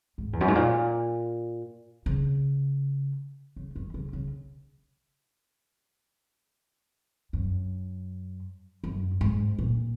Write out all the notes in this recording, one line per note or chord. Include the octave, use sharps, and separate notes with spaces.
G#2
E2
F#2
G#2
A#2
C#3
C#3
D#3
C#3
C#3
F#2
F#2
G#2
A#2